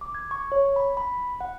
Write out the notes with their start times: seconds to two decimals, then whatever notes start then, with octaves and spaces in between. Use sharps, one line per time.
0.01 D6
0.15 G#6
0.31 C#6
0.52 C#5
0.76 B5
0.97 B5
1.41 F#5